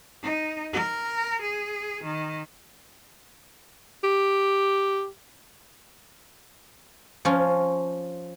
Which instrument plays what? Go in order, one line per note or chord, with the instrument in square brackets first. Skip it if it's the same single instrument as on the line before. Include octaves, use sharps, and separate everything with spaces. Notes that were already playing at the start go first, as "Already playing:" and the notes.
[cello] D#4
A#4
G#4
D#3
[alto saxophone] G4
[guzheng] F3 C#4 F4